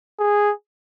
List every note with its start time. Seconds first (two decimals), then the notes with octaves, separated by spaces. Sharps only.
0.19 G#4